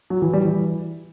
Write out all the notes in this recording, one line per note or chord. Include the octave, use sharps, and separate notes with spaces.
F#3
E3
G3
E3